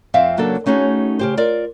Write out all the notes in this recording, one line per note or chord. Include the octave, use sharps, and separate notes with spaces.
F2 C4 E5 F5
C#3 F#3 A#3 D4 A4
A3 C#4 D#4 F#4 G#4
C#3 G4 C5
F4 A#4 D5